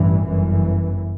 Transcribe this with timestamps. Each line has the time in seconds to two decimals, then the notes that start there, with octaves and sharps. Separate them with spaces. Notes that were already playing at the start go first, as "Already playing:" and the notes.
Already playing: A1 G2 E3
0.27 G1 F#2 E3